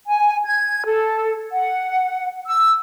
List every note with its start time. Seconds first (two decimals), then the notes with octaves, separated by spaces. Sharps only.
0.08 G#5
0.44 G#6
0.86 A4
1.52 F#5
2.47 E6